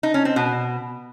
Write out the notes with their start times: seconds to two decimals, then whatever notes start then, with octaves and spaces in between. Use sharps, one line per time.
0.03 D#4
0.14 C#4
0.25 C4
0.36 B2